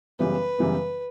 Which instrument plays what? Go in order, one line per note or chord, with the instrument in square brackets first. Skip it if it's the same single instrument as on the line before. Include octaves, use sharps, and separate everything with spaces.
[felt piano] F#2 C#3 E3 G3 B3 [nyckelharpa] B4
[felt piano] F#2 C#3 E3 G3 B3